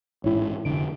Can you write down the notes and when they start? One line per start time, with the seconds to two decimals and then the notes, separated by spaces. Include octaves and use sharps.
0.24 A1 G#2 E4 C#5
0.65 F1 D3 D7